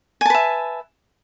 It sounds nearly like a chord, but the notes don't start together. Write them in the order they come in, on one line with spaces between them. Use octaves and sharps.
G#5 A5 B4 E5